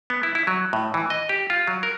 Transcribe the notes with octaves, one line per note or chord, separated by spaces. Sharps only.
B3
E4
E4
F#3
A2
E3
D#5
G4
F4
F#3
A#4